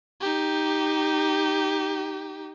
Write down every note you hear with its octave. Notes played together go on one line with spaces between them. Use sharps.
D#4 G4